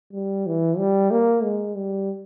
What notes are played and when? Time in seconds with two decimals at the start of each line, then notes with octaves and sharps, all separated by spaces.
0.13 G3
0.47 E3
0.78 G3
1.11 A#3
1.43 G#3
1.76 G3